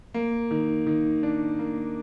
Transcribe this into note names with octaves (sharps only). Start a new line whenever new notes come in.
A#3
D#3
D#3
D4
A#3